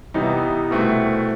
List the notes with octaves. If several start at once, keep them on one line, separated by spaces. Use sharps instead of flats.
C3 E3 G3 B3 D#4
C2 B2 A3 C4 E4